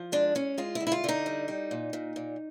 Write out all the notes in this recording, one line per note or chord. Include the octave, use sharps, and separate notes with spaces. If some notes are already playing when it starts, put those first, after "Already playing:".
Already playing: F3
G#3 D4
G#3 C#4
G#3 F4
E4
D3
E4
F4
D3 D#4
G3
G3
A#2
A#2
A#2